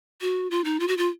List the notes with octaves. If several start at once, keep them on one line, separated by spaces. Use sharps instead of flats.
F#4
F4
D#4
F4
F#4
F4